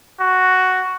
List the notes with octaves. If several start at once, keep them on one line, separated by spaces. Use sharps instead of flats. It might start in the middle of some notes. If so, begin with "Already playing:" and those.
F#4